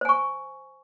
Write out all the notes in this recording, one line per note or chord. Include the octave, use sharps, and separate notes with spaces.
C5 G#5 C#6